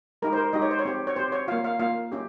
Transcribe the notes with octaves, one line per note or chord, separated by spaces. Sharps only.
G#3 D#4 G4 A#4
C5
A#4
G#3 D#4 G4 D#5
C#5
C5
C#5
C4 G4
C#5
C4 G4 C5
C#5
A#3 F4 F5
F5
A#3 F4 F5
C#4 G4